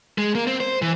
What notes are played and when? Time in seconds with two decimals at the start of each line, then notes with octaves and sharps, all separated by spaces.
0.18 G#3
0.35 A#3
0.47 C4
0.60 C5
0.82 E3